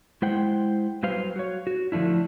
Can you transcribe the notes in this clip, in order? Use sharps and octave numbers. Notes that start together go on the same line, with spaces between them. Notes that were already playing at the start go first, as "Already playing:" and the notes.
G#3 E4 C5 F#5 G5
F#3 G3 B4 C5 F5
F#4 C#5
F#4
D3 F3 A3 D4 E4